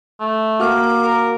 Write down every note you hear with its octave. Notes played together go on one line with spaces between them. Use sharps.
A3
A#3 F#4 F5 D6 F6
A#4